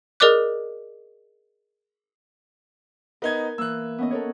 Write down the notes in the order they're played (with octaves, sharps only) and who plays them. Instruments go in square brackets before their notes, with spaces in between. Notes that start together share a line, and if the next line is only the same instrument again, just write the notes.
[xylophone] G#4 A#4 D5 D#5 D6 F#6
[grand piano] B3 D#4 G#6 [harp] A#4
[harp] E3 A#3 [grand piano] E6 F#6
[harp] B3 C#4 D#5
A4 A#4 C#5